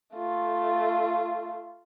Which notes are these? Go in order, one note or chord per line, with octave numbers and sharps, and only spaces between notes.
A3 F4